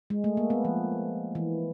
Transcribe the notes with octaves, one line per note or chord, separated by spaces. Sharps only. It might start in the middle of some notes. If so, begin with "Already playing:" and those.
G#3
A3
A#3
B3
F3
E3